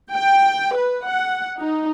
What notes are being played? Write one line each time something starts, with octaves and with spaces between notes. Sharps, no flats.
G5
B4
F#5
D#4